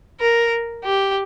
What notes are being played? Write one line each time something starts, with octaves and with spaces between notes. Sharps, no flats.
A#4
G4